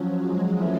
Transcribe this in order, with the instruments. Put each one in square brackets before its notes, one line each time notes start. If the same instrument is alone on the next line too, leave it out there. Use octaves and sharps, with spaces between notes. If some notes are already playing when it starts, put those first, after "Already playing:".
Already playing: [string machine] F3 F#3 [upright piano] C#4
[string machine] G#3
[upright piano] E3 A3 C#4